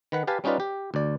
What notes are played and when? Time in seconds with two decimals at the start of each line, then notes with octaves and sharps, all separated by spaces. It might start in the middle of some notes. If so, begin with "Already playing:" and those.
0.12 D#3 B4 F#5
0.27 G4 B4 F5 G#5 A5
0.44 G3 C#4 D#4 F4 B4 D5
0.60 G4
0.94 D2 D5